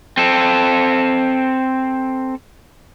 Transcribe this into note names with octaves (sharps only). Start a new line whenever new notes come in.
C4 A4